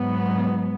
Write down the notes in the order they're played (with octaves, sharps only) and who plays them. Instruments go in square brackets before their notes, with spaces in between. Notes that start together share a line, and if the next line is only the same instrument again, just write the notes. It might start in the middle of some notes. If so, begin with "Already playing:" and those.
Already playing: [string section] G#2 F#3 B3